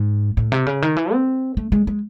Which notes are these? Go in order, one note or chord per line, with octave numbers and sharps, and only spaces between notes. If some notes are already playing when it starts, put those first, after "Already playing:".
Already playing: G#2
A2
C3
C#3
D#3
E3
C4
A3
G#3
G#3